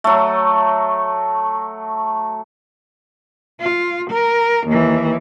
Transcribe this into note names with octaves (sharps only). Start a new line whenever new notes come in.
F#3 A3
F4
A#4
D#2 E3